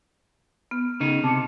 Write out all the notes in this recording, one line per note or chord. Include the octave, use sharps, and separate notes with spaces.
B3 F6
C#3 D#4
C3 A5 D6 C#7